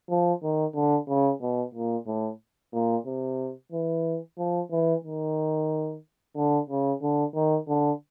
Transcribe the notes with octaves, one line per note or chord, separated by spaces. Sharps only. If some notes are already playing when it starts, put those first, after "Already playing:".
F3
D#3
D3
C#3
B2
A#2
A2
A#2
C3
E3
F3
E3
D#3
D3
C#3
D3
D#3
D3